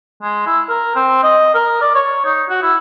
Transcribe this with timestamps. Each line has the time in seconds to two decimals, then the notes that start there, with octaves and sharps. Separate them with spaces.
0.23 G#3
0.47 E4
0.69 A#4
0.96 C4
1.23 D#5
1.55 A#4
1.81 D5
1.95 C#5
2.25 D#4
2.49 F#4
2.62 E4